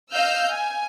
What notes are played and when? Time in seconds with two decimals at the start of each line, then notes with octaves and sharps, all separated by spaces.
0.13 D#5 F5 E6 F6 G6
0.52 G#5